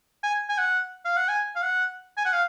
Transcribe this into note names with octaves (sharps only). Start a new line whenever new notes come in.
G#5
G#5
F#5
F5
F#5
G#5
F5
F#5
G#5
F#5
F5